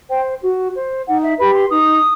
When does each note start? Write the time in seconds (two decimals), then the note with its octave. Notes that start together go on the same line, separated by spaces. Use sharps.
0.09 C5 G5
0.41 F#4
0.74 C5
1.06 D#4 F#5
1.22 E5
1.39 G4 B4 B5
1.55 C6
1.71 D#4 D#6